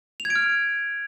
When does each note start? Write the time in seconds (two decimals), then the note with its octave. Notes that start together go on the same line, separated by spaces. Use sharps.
0.20 F7
0.25 G#6
0.30 D7
0.35 F6